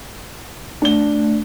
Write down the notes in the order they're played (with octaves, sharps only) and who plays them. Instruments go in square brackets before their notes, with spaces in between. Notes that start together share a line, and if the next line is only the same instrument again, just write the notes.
[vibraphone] A3 [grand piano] D4 G7